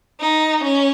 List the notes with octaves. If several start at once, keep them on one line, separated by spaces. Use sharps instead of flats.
D#4
C#4